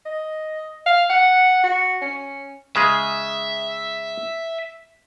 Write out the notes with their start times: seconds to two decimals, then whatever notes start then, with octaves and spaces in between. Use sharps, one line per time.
0.06 D#5
0.86 F5
1.10 F#5
1.64 F#4
2.01 C#4
2.76 C#3 G#3 G#4 E5